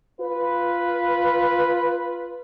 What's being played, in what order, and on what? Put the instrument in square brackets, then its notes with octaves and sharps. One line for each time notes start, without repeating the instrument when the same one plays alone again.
[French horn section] F4 B4